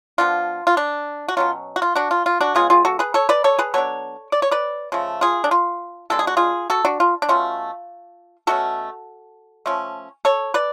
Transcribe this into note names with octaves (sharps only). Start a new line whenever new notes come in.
F3 B3 D4 F4
F4
D4
F#4
B2 F#3 C#4 F4
F#4
F4
D4 F#4
F4
F4
D4 F#4
C#3 G#3 B3 F4 G#4
F4 G#4
F#4 A4
G#4 B4
A4 C#5
B4 D5
A4 C#5
G#4 B4
F#3 B3 D4 A4 C#5
D5
C#5
B4 D5
C#3 F3 A3
F4 G#4
D4
F4
B2 G#3 D4 A4
G#4
F#4
F4 G#4
F#4 A4
D4 F#4
F4
D4
B2 A3 C#4 F4
B2 A3 C#4 F#4 A4
F3 A3 C#4
A4 C#5
B4 D5